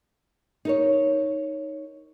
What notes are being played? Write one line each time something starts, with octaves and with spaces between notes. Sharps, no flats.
D#4 A#4 C#5